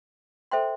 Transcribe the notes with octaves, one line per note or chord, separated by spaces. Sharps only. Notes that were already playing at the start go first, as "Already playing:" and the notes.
A4 C5 E5 G5 C6